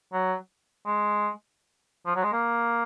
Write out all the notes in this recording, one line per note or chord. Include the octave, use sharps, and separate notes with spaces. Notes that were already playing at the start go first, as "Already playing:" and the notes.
F#3
G#3
F3
F#3
G#3
A#3